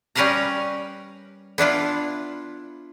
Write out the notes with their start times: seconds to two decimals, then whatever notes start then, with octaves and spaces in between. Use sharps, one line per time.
0.15 G3 C#4 A#4 B4 F5 A#5
1.58 B3 D4 E4 F4